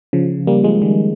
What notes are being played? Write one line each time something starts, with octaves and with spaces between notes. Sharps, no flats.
C#3 F3
G3 A#3
F3 G#3
D#3 G3